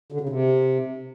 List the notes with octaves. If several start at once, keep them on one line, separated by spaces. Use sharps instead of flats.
D3
C#3
C3